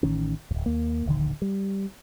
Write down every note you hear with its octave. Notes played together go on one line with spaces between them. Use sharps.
A1 D#3 C#4
D1 F2
D#2 A#3
D1 A#1 D3 D#3
G3